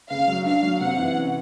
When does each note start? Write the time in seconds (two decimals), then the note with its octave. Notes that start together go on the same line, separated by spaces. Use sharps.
0.10 C#3 F5
0.28 F#3
0.45 D4 F5
0.63 F#3
0.81 C3 F#5
0.98 E3
1.15 C#4